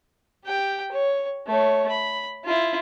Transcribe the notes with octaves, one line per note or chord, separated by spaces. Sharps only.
G4 G5
C#5
A3 C#5
B5
E4 F4